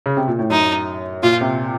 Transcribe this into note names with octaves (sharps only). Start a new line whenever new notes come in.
C#3
C3
A#2
A2
F#2 D#4
A#2 F4
C3